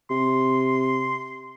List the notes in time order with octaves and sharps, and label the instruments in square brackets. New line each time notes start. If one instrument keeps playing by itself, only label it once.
[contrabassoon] C3 [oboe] C6